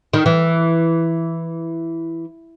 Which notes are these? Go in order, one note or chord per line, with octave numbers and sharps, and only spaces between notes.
D#3
E3